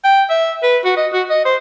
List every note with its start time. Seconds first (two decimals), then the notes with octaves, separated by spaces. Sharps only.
0.04 G5
0.30 E5
0.63 B4
0.85 F#4
0.97 D#5
1.13 F#4
1.30 D#5
1.45 C5